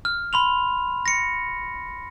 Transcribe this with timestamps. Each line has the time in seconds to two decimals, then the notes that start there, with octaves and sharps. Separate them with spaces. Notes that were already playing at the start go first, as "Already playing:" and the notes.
0.05 F6
0.33 B5 C6 F7
1.06 A#6 C#7